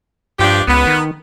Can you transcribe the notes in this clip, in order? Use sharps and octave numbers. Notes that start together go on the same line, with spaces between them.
G2 F3 D4 G4
C#2 B3
D#3